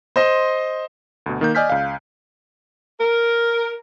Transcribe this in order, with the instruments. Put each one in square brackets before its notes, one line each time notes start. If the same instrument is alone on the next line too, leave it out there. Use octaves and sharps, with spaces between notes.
[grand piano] C5 D#5 C6
[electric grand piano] D2 B2
D#3 A#3 G6
D5 D#5 G#5 F6 G6 B6
C#2 F5
[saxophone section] A#4